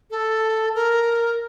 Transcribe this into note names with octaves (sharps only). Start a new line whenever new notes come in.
A4
A#4